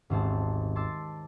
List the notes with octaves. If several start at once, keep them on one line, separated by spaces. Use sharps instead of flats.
D#1 G#1 C5 A5
A5 C6 D6 E6 A6